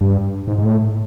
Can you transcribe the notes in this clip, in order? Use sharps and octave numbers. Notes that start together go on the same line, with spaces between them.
G2
G#2
G#2
A2